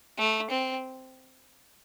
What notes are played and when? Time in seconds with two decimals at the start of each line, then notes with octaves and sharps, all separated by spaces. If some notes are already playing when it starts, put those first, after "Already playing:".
0.18 A3
0.51 C4